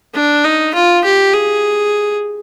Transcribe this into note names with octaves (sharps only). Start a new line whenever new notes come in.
D4
D#4
F4
G4
G#4